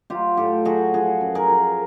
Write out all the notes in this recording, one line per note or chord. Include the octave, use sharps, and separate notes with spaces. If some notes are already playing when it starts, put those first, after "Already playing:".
F#3 F4 G4
A2 G4 A4
F#3 F#4 G#4
F3 F#4 G#4
F#2
G#4 A#4
F3